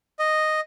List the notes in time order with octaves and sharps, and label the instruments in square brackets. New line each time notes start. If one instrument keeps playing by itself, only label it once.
[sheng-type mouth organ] D#5